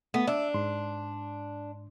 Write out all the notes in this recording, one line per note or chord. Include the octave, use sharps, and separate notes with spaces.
A3 B3
D4 E5 E6
G#2 C6